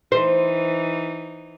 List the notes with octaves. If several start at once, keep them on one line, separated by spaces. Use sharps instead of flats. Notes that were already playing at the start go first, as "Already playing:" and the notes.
E3 D#4 C5